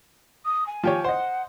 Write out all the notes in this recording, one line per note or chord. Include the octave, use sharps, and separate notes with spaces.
D#6
G#5
F3 G4 C#5
C5 D#5 F#5